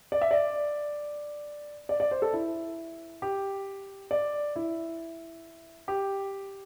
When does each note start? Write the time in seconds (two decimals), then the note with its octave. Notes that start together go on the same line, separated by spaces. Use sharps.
0.12 D5
0.21 E5
0.31 D5
1.89 D5
2.00 D5
2.11 C5
2.22 A4
2.33 E4
3.22 G4
4.11 D5
4.56 E4
5.88 G4